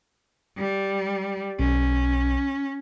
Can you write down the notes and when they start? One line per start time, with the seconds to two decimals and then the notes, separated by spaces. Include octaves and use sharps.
0.57 G3
1.59 B1 C#4